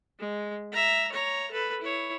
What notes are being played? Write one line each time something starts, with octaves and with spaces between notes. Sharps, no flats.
G#3
E5 A#5
C#5 A#5
A4 B4
E4 C#5